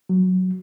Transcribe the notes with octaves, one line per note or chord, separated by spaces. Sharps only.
F#3